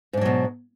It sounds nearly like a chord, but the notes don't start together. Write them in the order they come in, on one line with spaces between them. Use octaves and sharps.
G#2 D4 F#3 B2